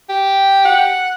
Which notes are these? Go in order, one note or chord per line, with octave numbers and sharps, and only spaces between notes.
G4
F#5